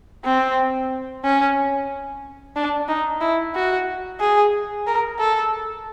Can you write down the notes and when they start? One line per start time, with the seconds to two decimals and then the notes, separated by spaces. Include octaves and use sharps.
0.25 C4
1.24 C#4
2.56 D4
2.88 D#4
3.21 E4
3.55 F#4
4.20 G#4
4.87 A#4
5.19 A4